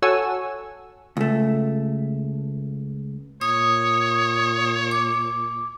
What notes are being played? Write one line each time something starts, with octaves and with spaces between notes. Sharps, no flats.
F#4 A4 C#5 F#5 G#5 E6
C#2 A3
A#2 C#5 D#6
D6